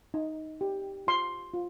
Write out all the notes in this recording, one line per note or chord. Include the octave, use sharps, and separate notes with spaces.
D#4
G4
F4 C6
F4